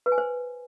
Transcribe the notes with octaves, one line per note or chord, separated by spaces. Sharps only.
B4
G#5
C5